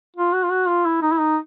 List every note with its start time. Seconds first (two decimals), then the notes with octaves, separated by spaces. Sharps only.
0.16 F4
0.33 F#4
0.44 F4
0.51 F#4
0.68 F4
0.85 E4
1.02 D#4
1.12 E4
1.19 D#4